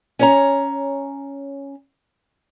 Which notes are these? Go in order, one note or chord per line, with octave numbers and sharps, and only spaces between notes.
C#4 C#5 A#5